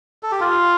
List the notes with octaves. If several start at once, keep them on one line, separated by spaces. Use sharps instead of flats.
A4
G4
F4